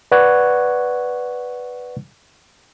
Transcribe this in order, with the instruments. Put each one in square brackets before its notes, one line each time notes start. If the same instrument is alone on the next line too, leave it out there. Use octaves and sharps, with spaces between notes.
[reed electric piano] B4 D5 F#5 C#6 F#6 G#6